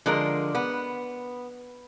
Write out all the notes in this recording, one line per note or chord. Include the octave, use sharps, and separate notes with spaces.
D3 F3 G#3 A#4
B3